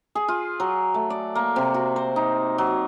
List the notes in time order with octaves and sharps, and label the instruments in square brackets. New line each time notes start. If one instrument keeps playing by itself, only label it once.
[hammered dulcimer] G#4
F4
F#3
A3
D5
A#3
C3
F#4
C5
D#4
F#3